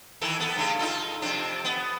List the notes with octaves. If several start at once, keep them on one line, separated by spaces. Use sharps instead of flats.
D#3 E3 A4
B3 A4
G2 C#3 A3
D#4 F4 A4
F2 C3 D4
B3